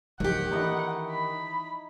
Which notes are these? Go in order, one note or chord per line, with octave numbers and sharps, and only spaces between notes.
D1 D#3 F3 F#3 G4 F#5
E3 D#4 E4 D#5
B5